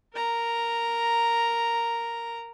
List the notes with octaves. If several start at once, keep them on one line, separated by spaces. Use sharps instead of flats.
A#4 A#5